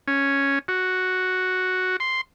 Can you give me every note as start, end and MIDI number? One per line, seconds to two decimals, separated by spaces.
0.08 0.59 61
0.68 1.97 66
2.00 2.21 84